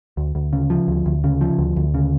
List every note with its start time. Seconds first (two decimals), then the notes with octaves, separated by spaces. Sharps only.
0.17 D2
0.35 D2
0.53 C#3
0.70 F3
0.88 D2
1.06 D2
1.24 C#3
1.41 F3
1.59 D2
1.76 D2
1.94 C#3